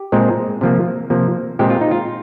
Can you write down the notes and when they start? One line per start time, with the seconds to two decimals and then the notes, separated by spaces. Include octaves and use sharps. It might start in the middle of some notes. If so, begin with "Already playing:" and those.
Already playing: G4
0.12 A#2 G#3 C4
0.61 C3 F3 A#3
1.10 C3 F3 A#3
1.59 A#2 G#3 C4 G4
1.70 F4
1.81 D#4
1.91 F4